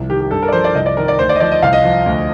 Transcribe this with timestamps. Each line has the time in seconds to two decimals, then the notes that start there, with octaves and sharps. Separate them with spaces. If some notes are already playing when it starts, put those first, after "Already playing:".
Already playing: C2 F3
0.09 D#3 G4
0.20 G4
0.31 G2 A4
0.42 A#4
0.48 D5
0.53 F3 C5
0.64 D5
0.75 C2 D#5
0.86 D5
0.97 D#3 A#4
1.08 D5
1.19 D2 C5
1.29 D5
1.35 D#5
1.40 F3 D5
1.51 D#5
1.62 C2 F5
1.73 D#5
1.84 F3
2.06 D2